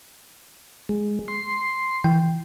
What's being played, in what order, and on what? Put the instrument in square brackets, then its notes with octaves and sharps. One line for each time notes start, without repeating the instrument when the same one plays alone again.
[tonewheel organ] G#3
C6
[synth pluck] E3 G5